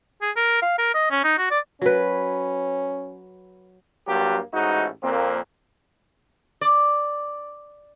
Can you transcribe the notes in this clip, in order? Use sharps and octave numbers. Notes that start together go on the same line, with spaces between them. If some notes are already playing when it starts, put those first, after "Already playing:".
G#4
A#4
F5
A#4
D#5
C#4
D#4
F#4
D5
F#3 C#4 B4
G2 F#3 A#3 G4
A1 G#2 D#4 F#4
F2 A#2 A#3 C4
D5